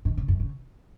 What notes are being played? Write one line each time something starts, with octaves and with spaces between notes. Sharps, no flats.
D#3
C#3
F#2
C#3